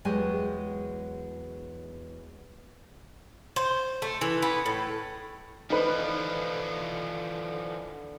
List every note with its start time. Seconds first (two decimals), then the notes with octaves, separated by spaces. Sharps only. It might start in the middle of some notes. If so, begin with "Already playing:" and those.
0.05 E2 F#3 G#3 G4 G#5
3.56 C5
4.02 A3
4.21 E3
4.42 B3
4.66 A2
5.70 D3 E3 F3 D#4 B4